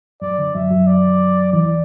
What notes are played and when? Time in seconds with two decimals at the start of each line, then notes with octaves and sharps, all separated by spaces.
0.22 F#2 F#3 D5
0.39 D3
0.55 F#2 F#3 E5
0.71 F#2 F#3
0.87 D5
1.53 E2 E3 D5